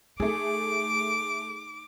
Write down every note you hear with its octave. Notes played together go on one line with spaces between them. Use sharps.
A3 D#4 G#4 D6